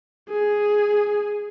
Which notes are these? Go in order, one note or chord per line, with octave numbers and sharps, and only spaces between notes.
G#4